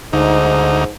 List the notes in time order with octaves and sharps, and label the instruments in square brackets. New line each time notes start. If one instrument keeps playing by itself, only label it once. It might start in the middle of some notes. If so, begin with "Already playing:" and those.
[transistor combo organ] D2 D#4 [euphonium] G#2